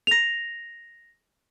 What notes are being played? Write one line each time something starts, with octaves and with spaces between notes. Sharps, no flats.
A#6 F7